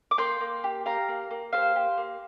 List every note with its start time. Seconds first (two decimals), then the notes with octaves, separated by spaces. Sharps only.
0.11 D6
0.18 A#3 G5 C6
0.41 A#3
0.64 G4
0.86 G4 F5 A#5
1.09 A#3
1.31 A#3
1.53 G4 C5 F5
1.76 G4
1.97 A#3